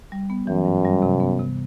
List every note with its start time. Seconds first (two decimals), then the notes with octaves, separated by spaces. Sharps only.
0.12 G3
0.30 B3
0.47 F#2 E3
0.66 G2
0.85 G3
1.02 C3
1.20 B3
1.39 C3